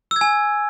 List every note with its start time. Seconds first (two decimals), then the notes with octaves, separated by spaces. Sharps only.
0.11 E6
0.16 G#6
0.21 G#5